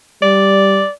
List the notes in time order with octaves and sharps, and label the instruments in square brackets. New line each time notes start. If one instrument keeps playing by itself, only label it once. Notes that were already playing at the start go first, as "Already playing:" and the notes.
[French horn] G3 [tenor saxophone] D5